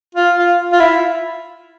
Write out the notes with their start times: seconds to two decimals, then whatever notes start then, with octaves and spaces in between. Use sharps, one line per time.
0.15 F4
0.37 F4
0.73 F4
0.80 E4